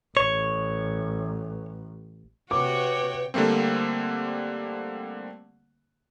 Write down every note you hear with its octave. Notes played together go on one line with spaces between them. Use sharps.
A1 C#5
C3 F#4 B4 C#5 G5 D6
D3 G3 A3 A#3 C4